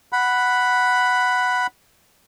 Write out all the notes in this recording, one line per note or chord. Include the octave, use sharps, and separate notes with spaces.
F#5 B5